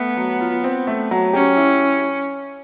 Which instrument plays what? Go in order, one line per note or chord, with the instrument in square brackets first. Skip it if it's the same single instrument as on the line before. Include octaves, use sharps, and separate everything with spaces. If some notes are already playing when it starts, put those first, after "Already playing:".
Already playing: [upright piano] A3 [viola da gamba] B3
[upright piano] F#3
F4
C4
A3
F#3
[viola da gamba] C#4 [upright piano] G4
[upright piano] E4